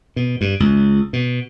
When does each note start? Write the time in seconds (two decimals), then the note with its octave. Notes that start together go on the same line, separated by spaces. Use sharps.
0.16 B2
0.41 G2
0.60 C#2
1.13 B2